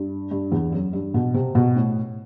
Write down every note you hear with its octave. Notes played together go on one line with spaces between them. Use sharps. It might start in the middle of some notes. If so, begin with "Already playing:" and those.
Already playing: G2
G2
E2
F#2
G2
B2
C3
B2
A2